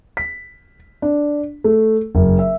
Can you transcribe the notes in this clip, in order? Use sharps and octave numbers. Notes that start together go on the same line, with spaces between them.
B6
D4
A3
F#1
E5